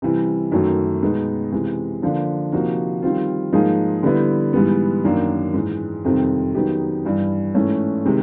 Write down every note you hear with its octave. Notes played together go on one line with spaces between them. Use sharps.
C3 E3 G3
F#2 D#3 F#3 A3
B2 G#3 B3 D#4
C3 E3 G#3
D3 F3 A#3 D4
C3 F3 A#3 D#4 F#4
D#3 G3 C4 F4
G#2 F3 A#3 D#4 G#4
D3 G3 B3 E4
G#2 E3 G3 B3
F#2 D#3 F#3 A#3 D4
G#2 E3 G#3
F2 C3 D#3 G3 C4
D#3 F#3 B3 D#4 G4
G2 E3 G3
G#2 E3 A3 C#4
C3 D#3 G#3